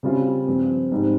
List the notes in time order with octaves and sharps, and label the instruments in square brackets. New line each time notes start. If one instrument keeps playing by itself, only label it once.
[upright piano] C#3 G3 C4 F4
G2 F3 C4
G#2 G3 C4 D#4